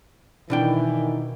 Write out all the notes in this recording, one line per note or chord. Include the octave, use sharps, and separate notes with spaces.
B2 D#3 E3 D4 G5